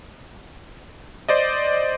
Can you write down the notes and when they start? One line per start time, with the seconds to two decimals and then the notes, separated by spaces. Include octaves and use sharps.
1.29 C5 D5 D#5